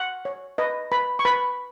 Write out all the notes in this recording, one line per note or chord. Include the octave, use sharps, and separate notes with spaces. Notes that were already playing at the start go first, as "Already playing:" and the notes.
Already playing: F#5
C#5
B4 D#5
B4 B5
C#6
B4 B5